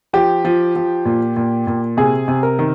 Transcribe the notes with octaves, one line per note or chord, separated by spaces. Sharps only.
F3 G4
F3
F3
A#2
A#2
A#2
C3 G#4
C3
A#4
D#3